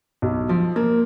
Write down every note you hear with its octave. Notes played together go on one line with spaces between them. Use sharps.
B1
F3
A#3